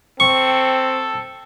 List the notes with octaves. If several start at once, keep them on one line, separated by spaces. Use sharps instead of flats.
C4 A4 C#6